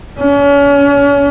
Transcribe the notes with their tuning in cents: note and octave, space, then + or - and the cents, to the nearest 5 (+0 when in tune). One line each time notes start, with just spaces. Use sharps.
C#4 +35